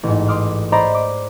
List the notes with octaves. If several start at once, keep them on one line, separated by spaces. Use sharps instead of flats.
A1 G#2
C6 D6 D#6 F6
C5 D5 D#5 A#5 B5
D6